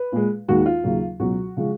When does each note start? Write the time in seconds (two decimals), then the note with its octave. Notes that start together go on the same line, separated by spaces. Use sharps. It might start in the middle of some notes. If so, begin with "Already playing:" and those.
Already playing: B4
0.12 A#2 G#3
0.48 D#2 D#3 G#3 F#4
0.66 F4
0.84 D#2 C#3 F#3
1.19 C#2 B2 F#3 F#4
1.57 C#3 F3 G#3